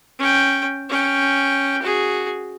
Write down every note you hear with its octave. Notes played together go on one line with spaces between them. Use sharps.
C#4 G5
C#4 G5
F#4 G#4